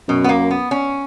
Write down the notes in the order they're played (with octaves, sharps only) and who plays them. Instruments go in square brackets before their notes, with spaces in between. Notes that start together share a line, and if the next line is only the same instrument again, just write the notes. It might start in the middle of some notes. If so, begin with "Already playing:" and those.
[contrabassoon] F#2 [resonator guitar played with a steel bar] B2
[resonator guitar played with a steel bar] B3
A#3
B3
C#4